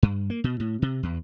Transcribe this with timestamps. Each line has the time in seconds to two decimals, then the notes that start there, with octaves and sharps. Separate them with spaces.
0.03 G2
0.30 A#3
0.44 B2
0.60 A2
0.82 C3
1.03 E2